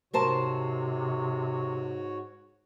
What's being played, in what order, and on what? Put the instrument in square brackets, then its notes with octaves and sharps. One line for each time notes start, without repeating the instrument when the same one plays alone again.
[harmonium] G#2 F#4 C#5 [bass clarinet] C3 [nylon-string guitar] A#4 C5 A5